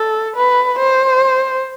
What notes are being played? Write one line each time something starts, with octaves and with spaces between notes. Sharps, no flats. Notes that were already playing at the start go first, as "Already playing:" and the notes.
Already playing: A4
B4
C5